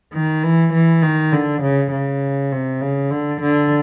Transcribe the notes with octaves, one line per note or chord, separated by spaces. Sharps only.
D#3
E3
E3
D#3
D3
C#3
C#3
C3
C#3
D3
D3